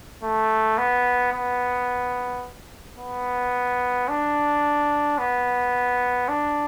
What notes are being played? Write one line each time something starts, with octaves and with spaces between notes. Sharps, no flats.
A3
B3
B3
B3
D4
B3
D4